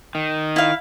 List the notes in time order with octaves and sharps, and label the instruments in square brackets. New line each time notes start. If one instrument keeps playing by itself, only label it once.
[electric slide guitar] D#3
[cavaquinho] E4 F5